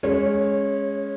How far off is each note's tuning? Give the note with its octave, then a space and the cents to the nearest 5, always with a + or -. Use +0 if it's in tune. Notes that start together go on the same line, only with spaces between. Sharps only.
G#3 +0 C#4 +0 C#5 -25